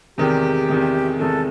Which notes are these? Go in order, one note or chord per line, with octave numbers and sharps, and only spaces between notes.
E2 C3 D#3 G#3 G4
E2 C3 D#3 G#3
E2 C3 D#3 G#3 A4